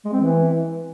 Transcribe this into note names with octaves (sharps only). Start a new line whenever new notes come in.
G#3
C4
E3